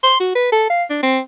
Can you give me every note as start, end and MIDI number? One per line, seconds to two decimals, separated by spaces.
0.04 0.17 84
0.20 0.33 66
0.35 0.52 71
0.52 0.65 69
0.70 0.84 77
0.90 0.98 62
1.03 1.19 60